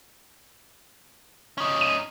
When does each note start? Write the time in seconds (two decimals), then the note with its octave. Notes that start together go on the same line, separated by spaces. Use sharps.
1.58 C#4 D#4
1.81 D#7